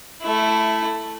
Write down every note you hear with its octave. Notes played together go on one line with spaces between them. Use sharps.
A3 E4